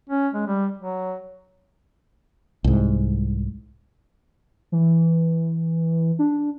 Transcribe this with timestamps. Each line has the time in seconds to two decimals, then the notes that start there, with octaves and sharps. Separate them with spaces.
0.10 C#4
0.33 G#3
0.47 G3
0.78 F#3
2.64 C2 G#2
4.72 E3
6.19 D4